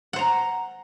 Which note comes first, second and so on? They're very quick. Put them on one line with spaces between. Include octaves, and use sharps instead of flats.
F#5 C5 A#5